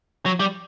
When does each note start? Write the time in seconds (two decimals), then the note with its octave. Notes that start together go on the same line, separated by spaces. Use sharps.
0.26 F#3
0.40 G3